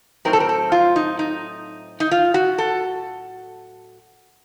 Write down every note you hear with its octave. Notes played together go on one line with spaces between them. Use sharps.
A2 F#3 C4 D#4 A#4
A4
A#4
A4
F4
D#4
D#4
D#4
F4
F#4
A4